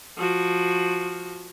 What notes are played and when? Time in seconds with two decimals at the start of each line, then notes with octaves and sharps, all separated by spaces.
0.18 F3 F#4